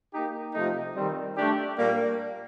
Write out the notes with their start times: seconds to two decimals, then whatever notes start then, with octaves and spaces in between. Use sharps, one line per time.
0.13 A#3 D#4 G4
0.54 C3 F3 A3 D#4
0.95 D#3 G3 C4
1.36 A3 D4 G4
1.78 A#2 G3 A#3